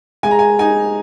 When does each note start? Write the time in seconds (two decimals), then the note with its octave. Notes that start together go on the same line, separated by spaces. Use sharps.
0.23 G#3 G#5
0.31 A#5
0.39 G#5
0.59 D#4 G#5